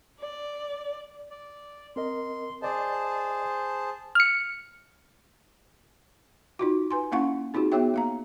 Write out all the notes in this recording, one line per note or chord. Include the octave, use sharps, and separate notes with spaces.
D5
D5
C4 A#4 D#5 C6
G#4 C5 D5 D#5 A5
F6 C#7
D#4 F4 F#4
B4 G#5 C6
A#3 C#4 E4 F5 F#5 C#6
C4 D#4 F4 F#4 G#4
B3 F#4 G#4 C#5 E5 G5
A#3 F5 A#5